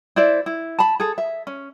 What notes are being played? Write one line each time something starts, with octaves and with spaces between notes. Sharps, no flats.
E4 C5 D5 E5
E4
A5 B5
G#4 A4
E5
C#4